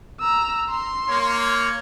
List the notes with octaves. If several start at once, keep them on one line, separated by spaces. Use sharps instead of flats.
A#5 E6
C6
A#3 C#5